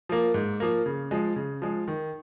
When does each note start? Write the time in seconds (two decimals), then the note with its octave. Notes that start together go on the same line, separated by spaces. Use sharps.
0.09 F3 A#3
0.34 G#2
0.60 F3 A#3
0.86 C#3
1.11 F3 G#3
1.36 C#3
1.62 F3 G#3
1.88 D#3